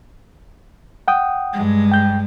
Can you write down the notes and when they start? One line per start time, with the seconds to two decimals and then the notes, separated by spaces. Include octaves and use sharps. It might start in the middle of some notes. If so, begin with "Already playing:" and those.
1.08 F#5 G5 D#6
1.53 G2 G#3
1.92 G5 G6